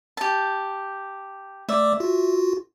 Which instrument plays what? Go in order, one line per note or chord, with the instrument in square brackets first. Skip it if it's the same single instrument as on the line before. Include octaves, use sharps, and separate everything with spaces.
[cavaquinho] G4 A5
[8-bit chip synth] A3 D5 D6 [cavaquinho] E5
[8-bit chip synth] F4 F#4